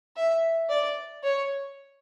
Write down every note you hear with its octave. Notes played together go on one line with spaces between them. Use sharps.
E5
D5
C#5